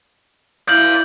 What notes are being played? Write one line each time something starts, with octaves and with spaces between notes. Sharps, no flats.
E4 D5 F5 G6 F#7